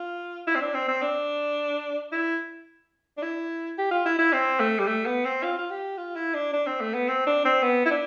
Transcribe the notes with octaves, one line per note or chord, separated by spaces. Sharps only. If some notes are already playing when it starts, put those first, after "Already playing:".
Already playing: F4
E4
C4
D4
C4
C4
D4
E4
D4
E4
G4
F4
E4
E4
C4
A3
G3
A3
B3
C4
F4
F4
G4
F4
E4
D4
D4
C4
A3
B3
C4
D4
C4
B3
E4
D4